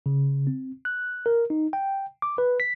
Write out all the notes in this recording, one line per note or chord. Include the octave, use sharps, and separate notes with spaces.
C#3
C4
F#6
A#4
D#4
G5
D6
B4
B6